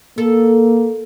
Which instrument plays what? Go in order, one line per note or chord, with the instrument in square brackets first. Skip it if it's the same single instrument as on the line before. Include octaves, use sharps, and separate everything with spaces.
[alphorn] A#3 [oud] A4